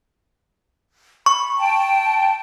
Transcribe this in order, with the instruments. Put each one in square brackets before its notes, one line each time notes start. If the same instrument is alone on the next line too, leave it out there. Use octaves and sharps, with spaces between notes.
[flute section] B5 [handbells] C#6
[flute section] G5 A5